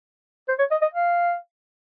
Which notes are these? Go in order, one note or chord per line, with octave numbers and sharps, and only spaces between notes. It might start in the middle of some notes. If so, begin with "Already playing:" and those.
C5
C#5
D#5
D#5
F5